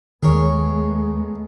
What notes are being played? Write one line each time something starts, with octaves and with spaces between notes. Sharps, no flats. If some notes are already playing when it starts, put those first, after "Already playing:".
D#2 G#3 A3 B3 G#4 A#4 C#5